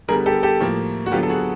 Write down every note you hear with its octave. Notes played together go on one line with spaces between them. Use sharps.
D3 G3 B3 G#4 A#4
G4 A4
G4 A4
A2 F3 A#3
F#4
D3 F#3 B3 F4 G4
A4
F#4 G#4